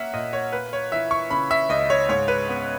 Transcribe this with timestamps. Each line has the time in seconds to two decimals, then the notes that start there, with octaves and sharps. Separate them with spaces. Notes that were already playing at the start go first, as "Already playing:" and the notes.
Already playing: A#3 C#4 E5 F#5
0.13 A#2 D#5
0.33 C#5
0.52 A#3 B4
0.73 C#5
0.92 E3 E5
1.11 C#6
1.30 C#3 B5
1.51 E5
1.69 C#2 D#5
1.90 C#5
2.09 G#2 C#5
2.28 B4
2.48 B3